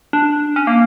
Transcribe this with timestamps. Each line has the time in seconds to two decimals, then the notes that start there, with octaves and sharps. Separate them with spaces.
0.13 D4
0.56 C#4
0.67 A#3